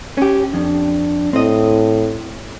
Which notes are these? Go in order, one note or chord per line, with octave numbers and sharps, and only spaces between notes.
C#4 G4
F2 D4
A2 C4 D#5